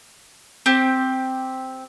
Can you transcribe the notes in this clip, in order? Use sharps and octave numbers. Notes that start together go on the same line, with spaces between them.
C4 G4